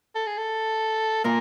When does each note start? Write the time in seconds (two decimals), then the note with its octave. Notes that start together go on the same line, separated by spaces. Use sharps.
0.15 A4
0.27 G#4
0.38 A4
1.24 A#2 A#3 A#4